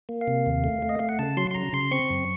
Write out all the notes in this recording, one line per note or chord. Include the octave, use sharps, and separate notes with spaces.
A#3
F5
C3
D#2
A3
A3
D#5
A3 F5
F#5
C#3 A5
F#3 C6
C6
C#3 A#5
C#3 C6
C4 C#6
F#2